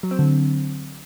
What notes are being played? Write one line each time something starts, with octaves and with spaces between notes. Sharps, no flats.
F#3
C4
D3